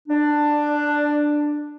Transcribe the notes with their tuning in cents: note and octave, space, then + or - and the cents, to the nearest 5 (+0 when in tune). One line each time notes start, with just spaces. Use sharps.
D4 +10